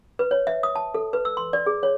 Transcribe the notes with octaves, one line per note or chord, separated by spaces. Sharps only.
B4
C#5
E5
D#6
A5
A4
B4
E6
C6
D5
G#4
C#5